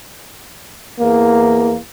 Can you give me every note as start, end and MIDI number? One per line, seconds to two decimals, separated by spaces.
1.00 1.75 40
1.00 1.75 58